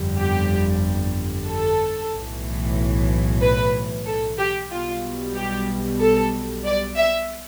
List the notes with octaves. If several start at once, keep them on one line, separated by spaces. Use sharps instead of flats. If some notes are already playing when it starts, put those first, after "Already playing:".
Already playing: G1 F2 D3 G3
G4
A4
B1 A2 E3
B4
A4
G4
B1 B2 G3 F4
G4
A4
D5
E5